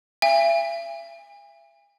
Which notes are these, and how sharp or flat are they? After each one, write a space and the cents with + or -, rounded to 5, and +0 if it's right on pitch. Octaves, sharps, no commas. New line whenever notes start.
E5 +35 G#5 -40